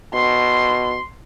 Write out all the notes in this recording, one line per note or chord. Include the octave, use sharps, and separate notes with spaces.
B2 C6